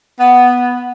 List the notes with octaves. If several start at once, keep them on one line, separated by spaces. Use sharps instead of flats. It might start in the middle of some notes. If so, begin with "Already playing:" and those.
B3